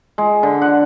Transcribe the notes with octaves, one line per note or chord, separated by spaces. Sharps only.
G#3
D3
F#5